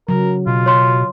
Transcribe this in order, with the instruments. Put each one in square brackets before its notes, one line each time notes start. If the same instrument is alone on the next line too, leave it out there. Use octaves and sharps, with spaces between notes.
[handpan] C#3 F#3 [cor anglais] A#4
[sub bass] B2 [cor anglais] F4
[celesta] C#5 C6